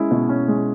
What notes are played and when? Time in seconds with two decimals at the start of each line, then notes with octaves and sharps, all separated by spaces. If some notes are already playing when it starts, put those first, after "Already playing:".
Already playing: G#3 C#4 E4
0.11 B2
0.29 C#4
0.48 G#3